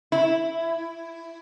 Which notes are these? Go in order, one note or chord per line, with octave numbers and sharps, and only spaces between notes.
E4